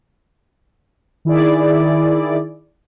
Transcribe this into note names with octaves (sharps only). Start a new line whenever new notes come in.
D#3 E4 G#4 D5